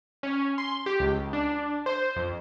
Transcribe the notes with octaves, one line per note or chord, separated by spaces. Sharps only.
C#4
C6
G4
C#2
D4
C5
F2